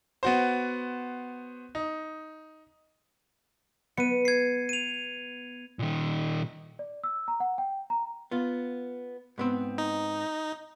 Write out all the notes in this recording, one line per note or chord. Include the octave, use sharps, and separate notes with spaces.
B3 F#4 C5
D#4
B3 C#7 D#7
G#6 C7
D#7 F7
A#2 D#3
D5
E6
A#5
F#5
G5
A#5
B3 F4
G#2 B3 C4
D#4